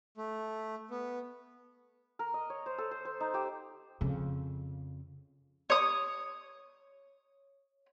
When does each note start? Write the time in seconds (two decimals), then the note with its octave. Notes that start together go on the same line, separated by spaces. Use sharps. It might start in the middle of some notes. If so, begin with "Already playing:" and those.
0.18 A3
0.91 B3
2.19 A#4
2.34 D#5
2.50 C#5
2.66 C5
2.78 A4
2.91 C5
3.05 C5
3.20 D#4
3.34 G4
4.01 F2 C#3
5.70 C#5 D#6